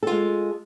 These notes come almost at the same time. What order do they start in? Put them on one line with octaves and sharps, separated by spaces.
A4 F4 G#3